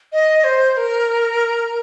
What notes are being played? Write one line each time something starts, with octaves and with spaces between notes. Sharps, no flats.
D#5
C5
A#4